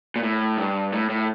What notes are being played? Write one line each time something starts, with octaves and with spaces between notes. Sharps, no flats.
A#2
A2
G2
A2
A2